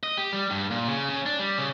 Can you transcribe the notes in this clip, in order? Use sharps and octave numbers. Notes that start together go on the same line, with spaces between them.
D#5
G4
G3
G2
A#2
C#3
C#3
D4
G3
C#3